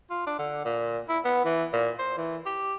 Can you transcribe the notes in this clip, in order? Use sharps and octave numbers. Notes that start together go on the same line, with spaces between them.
F4
D4
D3
A#2
E4
B3
E3
A#2
C5
E3
G4